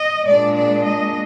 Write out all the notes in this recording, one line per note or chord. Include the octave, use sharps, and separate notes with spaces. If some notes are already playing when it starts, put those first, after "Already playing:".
Already playing: D#5
A#2 G#3 D4 D5
D5
D#5